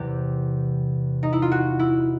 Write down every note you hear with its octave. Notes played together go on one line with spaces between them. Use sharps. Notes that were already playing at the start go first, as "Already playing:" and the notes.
Already playing: E2 C3 E3 G4
D#4
E4
F4
F#4
E4